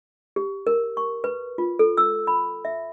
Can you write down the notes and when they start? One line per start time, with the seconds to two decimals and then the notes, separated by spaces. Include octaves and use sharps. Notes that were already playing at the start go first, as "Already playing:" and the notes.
0.36 G4
0.67 A#4
0.97 C#6
1.24 B4
1.58 F4
1.79 A4
1.97 E6
2.27 B5
2.65 E5